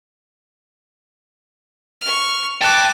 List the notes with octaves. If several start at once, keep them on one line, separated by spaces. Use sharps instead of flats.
C#6 F6
G5 A5 D6 F#6 A6